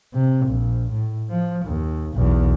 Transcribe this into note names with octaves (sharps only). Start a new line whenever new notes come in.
C3
A#1
A2
F3
D#2
B1 E2